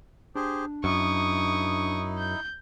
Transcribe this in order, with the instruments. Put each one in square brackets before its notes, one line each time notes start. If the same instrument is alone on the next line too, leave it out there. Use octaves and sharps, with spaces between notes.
[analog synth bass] D4 [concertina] G4 G#4 C5
[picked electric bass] F#2 [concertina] D#4 E4 [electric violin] C#6 D#6
[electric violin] G6